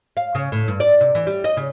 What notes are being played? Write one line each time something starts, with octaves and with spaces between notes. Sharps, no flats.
F5
C#3
A2
G2
D5
C3
E3
G3
D#5
C#3